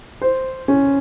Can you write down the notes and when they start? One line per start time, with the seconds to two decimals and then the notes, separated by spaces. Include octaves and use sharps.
0.22 C5
0.68 C#4